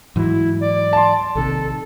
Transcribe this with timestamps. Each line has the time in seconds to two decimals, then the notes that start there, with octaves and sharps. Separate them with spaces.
0.16 G#2 E3 F#3 E4
0.61 D5
0.93 A5 C6
1.35 A#1 C3 D#3 A4